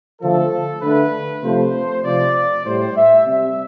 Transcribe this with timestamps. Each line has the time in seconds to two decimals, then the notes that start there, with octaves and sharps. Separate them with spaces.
0.21 D3 F3 A3 A4
0.82 D3 A3 B4
1.43 C3 F3 A3 C5
2.04 C3 F3 A3 D5
2.65 A2 G3 C5
2.96 E5
3.26 C3 G3 E5